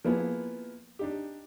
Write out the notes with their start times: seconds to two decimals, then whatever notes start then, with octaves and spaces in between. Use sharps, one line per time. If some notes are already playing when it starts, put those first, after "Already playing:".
0.04 F3 A#3 B3 E4 G#4
0.99 D4 D#4 G4